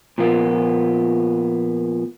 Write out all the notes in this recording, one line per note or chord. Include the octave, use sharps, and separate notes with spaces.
A#2 F3 A#3 B3